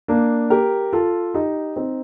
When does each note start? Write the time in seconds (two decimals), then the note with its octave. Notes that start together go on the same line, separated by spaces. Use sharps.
0.08 A#3 D4
0.50 G4 A#4
0.93 F4 A4
1.34 D#4 G4
1.76 C4 D#4